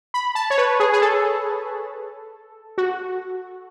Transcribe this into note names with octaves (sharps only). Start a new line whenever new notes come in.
B5
A5
C#5
B4
G#4
G#4
A4
F#4